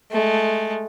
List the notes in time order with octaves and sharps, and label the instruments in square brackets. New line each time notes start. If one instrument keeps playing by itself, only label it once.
[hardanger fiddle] G#3 A3